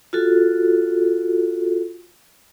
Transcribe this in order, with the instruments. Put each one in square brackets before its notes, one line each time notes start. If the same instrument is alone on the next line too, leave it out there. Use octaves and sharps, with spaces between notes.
[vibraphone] F4 F#4 A4